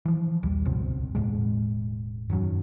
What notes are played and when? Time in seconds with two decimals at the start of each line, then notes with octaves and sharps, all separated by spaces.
0.05 E3 F3
0.43 A#1 D#2 G3
0.65 G1 C#2 B2 C4
1.15 E1 E2 A2 G#3
2.30 F#2 D#3 F#3 C#4